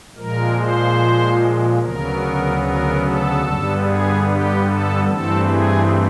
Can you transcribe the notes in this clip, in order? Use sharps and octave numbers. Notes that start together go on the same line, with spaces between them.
A#2 F3 G#3 A#4
C5
D2 C#3 F#3 B3 A#4
A#4
A4
G2 D3 G3 B3
G#4
G4
A4
G2 E3 A3 C4 A4
G#4